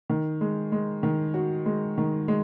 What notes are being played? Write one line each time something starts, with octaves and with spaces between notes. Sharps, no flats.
D#3
G#3
G#3
D#3
F#4
G#3
D#3
G#3